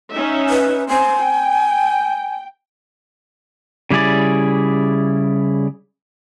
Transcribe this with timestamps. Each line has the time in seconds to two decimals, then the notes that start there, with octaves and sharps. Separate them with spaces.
0.12 C#4 D#4 E5
0.49 B4
0.89 C4 C5 G#5
1.19 G5
3.90 C#3 G3 E4 G#4 D5